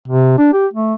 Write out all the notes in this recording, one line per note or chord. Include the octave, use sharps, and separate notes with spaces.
C3
D4
G4
A3